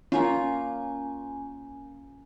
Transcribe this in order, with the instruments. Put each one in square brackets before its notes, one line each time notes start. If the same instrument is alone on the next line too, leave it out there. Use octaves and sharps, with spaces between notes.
[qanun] A#3 F4 [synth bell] C#4 G#5